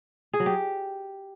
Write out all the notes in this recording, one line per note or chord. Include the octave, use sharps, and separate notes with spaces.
G#4
F#3
G4